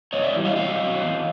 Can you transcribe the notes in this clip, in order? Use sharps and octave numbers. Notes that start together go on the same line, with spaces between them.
G#2 C#5 D#5
D5 E5
E3 G3
D#5 F5
B2 D#5 F5
F#3
E2